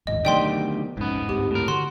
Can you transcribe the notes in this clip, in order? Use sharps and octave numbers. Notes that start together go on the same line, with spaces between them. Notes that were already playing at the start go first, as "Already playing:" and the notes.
A1 D#2 G#2 D#5
D2 D#3 F#3 B3 G4 D5 G5 C6
A#1 F2 G#2 B3 C#4
D2 G2 C4 G4
A2 A#4
D3 F#4 C6